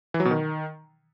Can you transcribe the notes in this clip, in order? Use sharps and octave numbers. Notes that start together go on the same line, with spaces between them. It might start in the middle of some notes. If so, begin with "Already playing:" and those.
E3
F#3
B2
D#3